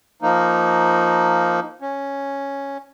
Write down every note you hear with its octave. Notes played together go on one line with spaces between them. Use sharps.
F3 A#3 D#4
C#4